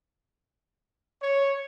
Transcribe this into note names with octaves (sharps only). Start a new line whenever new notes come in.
C#5